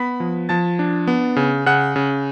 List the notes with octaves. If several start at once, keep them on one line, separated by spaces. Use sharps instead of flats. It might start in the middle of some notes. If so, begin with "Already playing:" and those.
Already playing: B3 B5 B6
F3
F3 A5 A6
D4
B3
C#3
C#3 F#5 F#6
C#3